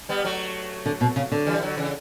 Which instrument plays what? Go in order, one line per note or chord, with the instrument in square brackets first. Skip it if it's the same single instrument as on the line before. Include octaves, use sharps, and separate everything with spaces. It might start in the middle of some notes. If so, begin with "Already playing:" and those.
[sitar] G3 B3
F#3 A3
[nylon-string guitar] D3
B2
C#3
D3
[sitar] E3 G3
D3 F#3
C#3 E3